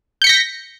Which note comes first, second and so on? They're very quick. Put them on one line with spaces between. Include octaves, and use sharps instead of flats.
G6 C#7 B6 A#6